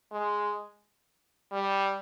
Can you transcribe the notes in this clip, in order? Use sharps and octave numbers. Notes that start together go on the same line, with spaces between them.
G#3
G3